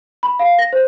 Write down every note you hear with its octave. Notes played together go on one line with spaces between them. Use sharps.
B5
F5
A#6
C5